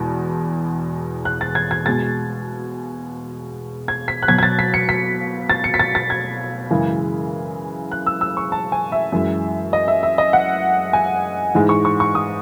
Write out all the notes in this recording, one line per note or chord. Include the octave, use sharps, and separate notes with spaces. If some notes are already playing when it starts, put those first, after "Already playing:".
Already playing: E2 B2 G#3
F#6
A6
G#6
G#6
B2 G#3 A6
G#6
B6
F#6
B2 F#3 G#6
G#6
A6
B6
C#7
B6
A6
C#7
B6
A6
A6
G#6
F#2 C#3 E3 G#3
F#6
E6
E6
C#6
A5
G#5
E5
F#2 E3 G#3
D#5
E5
E5
D#5
F#5
G#5
G#2 E3 G#3
C#6
C#6
C#6
D#6